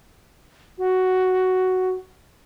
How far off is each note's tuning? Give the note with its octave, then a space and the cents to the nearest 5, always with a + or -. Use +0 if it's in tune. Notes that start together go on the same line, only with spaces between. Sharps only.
F#4 +5